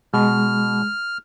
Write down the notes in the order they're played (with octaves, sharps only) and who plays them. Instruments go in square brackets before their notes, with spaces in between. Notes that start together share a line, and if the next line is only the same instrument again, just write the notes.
[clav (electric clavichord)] B2 [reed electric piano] G#3 [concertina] F6